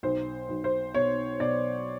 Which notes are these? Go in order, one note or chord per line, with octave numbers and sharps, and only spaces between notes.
B1 C5
B1
C5
B2 C#5
B2 D5